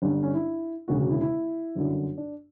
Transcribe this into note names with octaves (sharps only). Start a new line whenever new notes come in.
G1 G2 D3 C#4
C#4
E4
E1 D2 C#3 F#4
F#4
E4
E4
G1 F#2 D3
D4